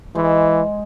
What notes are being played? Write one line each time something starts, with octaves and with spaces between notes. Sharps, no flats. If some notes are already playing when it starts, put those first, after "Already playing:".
E3 G#3 C5